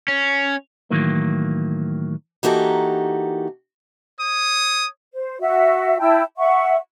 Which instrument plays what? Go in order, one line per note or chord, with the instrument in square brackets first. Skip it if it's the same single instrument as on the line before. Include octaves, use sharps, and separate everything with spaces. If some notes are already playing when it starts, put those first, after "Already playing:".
[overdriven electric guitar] C#4
[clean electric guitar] A2 D#3 E3 F#3 A#3
[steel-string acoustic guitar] E3 A#3 D#4 F#4 G4 A4
[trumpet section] C#5 D#6
[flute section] C5
F#4 E5
E4 G5 A5
E5 F#5 C#6